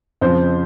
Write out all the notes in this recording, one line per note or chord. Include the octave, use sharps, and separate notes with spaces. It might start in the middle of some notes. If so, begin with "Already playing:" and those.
F2 C#3 F3 C5